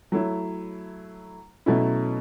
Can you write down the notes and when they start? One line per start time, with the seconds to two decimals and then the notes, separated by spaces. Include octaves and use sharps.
0.12 F#3 A3 E4
1.66 B2 F#3 A3 C#4 E4